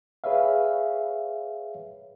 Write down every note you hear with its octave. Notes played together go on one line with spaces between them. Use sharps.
G#4 B4 C#5 E5 F5